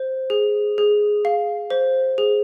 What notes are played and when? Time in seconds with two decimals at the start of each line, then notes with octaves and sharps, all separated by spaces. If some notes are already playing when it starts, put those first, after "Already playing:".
Already playing: C5
0.30 G#4
0.78 G#4
1.25 F5
1.70 C5
2.18 G#4